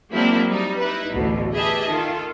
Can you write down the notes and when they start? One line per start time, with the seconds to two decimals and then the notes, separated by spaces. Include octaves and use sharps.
0.12 F#3 G#3 A#3 C4 D4 E4
0.49 G3 D#4
0.80 D#4 E4 B4
1.14 A1 D2 B2
1.55 G4 G#4 B4 D#5 E5 A5
1.89 D#3 F4 A4